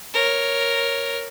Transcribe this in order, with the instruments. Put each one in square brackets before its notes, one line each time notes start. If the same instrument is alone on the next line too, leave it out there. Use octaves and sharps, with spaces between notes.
[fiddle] A#4 C#5